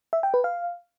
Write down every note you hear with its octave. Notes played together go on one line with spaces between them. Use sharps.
E5
G5
B4
F5